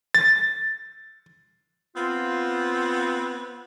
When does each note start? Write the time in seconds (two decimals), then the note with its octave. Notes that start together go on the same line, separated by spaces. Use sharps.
0.15 A6
1.96 B3 C4 F4